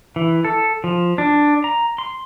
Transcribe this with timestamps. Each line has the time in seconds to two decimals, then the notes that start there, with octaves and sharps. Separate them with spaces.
0.16 E3
0.44 A4
0.84 F3
1.18 D4
1.64 A#5
1.98 C6